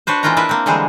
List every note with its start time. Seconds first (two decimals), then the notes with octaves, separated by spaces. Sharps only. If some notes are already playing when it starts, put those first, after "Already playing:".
0.07 D4 F#4 B4 C5
0.23 E3 G#3 A#3 F4 G5 A#5
0.37 D4 E4 A#4 B4
0.49 A#3 C4
0.66 D3 E3 G3 G#3 G#4 C5